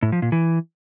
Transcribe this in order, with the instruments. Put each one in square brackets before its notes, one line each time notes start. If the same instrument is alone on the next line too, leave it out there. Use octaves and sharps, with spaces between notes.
[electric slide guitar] A2
F3
A#2
E3